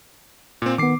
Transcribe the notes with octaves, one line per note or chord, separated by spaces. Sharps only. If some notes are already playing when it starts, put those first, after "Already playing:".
A#2 C4
D#3 B3 D6 C7